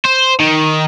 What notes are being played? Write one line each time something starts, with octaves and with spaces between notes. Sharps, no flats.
C5
D#3